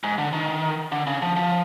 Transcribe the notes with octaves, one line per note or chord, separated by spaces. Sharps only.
G#2
D3
D#3
D3
C#3
F3
F3